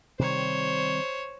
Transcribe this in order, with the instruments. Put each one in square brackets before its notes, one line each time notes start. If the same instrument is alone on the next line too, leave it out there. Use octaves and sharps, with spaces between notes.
[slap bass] C3 D#3 G3 [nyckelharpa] C5 C#5